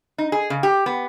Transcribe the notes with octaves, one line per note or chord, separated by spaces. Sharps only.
D#4
G#4
C#3
G4
B3